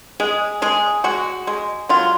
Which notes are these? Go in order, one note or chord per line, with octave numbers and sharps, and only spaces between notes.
G#3 G#4
G#3 G#4
G#3 F#4
G#3
F#3 F4